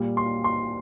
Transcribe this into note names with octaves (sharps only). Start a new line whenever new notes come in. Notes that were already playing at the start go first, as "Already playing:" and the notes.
Already playing: A#2 G3
C6
C6